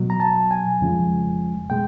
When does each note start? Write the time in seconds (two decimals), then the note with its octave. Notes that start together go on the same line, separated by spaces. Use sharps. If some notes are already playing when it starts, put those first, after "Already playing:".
Already playing: B2 F#3
0.10 A#5
0.20 A5
0.51 G#5
0.81 F2 C#3 F3 G#3
1.70 B2 G#3 G5